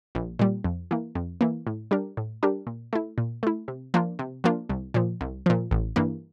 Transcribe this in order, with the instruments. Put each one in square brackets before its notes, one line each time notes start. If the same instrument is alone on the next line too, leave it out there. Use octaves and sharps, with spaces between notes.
[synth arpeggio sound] A#1
A#2 G3
F2
E3 A#3
F2
E3 A#3
A2
G3 D4 G4 A#4
A2
G3 D4 G4 A#4
A#2
A3 E4
A#2
A3 E4
C3
F3 A#3 D4 F4
C3
F3 A#3 D4 F4
C2
A#2 F3
C2
A#2 F3
A1
G2 E3 A#3